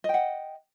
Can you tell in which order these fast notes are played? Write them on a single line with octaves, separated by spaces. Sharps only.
D#5 G5 F#5